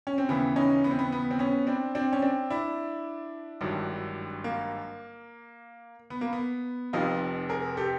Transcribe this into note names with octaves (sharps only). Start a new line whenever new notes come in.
C#4
C4
D#2 C#3 E3 B3
C#4 D#4
B3
C4
B3
B3
C4
B3 C#4
C4 D4
C4 D4
C#4
C4 D4
D4 E4
G#1 G2 D3 F#3
A#3
B3
A#3
B3
F1 F2 C3 D#4 F4
G#4 A#4
G4 A4